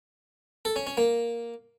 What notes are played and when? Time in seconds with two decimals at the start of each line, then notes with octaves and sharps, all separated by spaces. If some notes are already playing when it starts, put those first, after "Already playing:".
0.65 A4
0.76 C#4
0.87 C#4
0.97 A#3